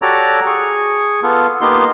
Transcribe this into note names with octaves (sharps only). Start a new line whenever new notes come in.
F#4 G4 A4 C#5 D5 A#5
G#4 C#6
B3 F4 A4
A#3 B3 D#4 F4 G4 C6